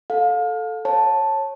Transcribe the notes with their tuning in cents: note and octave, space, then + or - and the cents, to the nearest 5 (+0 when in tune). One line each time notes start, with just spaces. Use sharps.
A4 +0 F5 +30
C#5 -20 A5 +0